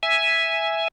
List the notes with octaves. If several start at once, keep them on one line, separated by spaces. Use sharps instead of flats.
E5 G#5